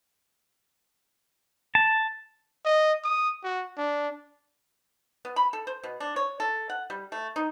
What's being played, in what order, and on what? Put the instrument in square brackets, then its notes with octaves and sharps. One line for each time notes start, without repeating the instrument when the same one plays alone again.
[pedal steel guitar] A5
[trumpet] D#5
D#6
F#4
D4
[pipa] B3
B5
A4
C5
B2
D4
C#5
A4
F#5
G3
A3
D#4